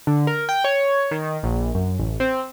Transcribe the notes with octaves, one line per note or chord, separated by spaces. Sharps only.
D3
A#4
G5
C#5
D#3
A#1
F#2
A1
C4